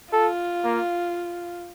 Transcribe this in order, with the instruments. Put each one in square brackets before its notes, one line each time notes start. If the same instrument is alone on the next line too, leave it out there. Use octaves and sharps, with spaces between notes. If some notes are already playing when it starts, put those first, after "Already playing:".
[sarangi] F4 [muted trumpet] A4
[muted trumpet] A#3